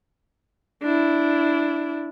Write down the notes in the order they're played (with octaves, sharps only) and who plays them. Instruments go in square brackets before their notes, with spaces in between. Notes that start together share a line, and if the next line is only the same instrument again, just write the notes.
[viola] D4 E4